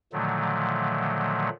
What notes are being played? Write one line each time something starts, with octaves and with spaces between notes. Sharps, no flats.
A#2 D3 D#3 F3 F#3 A3